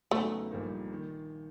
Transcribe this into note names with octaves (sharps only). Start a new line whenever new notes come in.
E2 C#3 F#3 A3 B3 D#4
A#1 A#2 G3 A#3 D#4
D#3